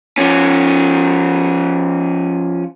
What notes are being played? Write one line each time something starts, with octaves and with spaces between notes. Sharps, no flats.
F3 C#4